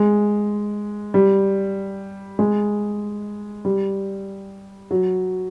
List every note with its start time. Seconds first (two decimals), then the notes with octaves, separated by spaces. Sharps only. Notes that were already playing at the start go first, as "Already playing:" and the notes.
Already playing: G#3
1.14 G3
2.39 G#3
3.65 G3
4.91 F#3